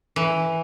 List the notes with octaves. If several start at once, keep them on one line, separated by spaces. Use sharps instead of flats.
E3